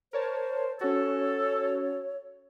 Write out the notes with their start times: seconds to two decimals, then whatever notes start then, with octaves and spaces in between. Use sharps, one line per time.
0.13 A#4 C5 C#5 A5
0.81 C#4 F#4 A4 C#5